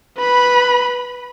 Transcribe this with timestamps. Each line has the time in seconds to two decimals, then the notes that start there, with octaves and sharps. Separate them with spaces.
0.18 B4 B5